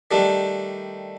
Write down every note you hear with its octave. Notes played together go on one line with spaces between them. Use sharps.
D#3 G3 A3 D4